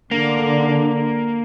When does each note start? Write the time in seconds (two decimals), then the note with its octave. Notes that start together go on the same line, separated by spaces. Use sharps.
0.11 D3 A#3